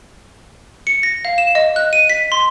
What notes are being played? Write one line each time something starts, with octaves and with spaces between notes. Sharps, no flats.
C#7
A#6
F5
E7
D#5
F#6
D#7
B6
C6